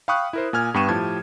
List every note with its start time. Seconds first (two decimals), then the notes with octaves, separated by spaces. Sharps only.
0.08 F5 G5 B5 C#6 D#6 F#6
0.33 E4 A#4 C5
0.53 A#2 G#5 F6 G#6
0.74 G2 B3 G5 C#6 D#7 E7
0.89 A2 F3 G4 A5 G#6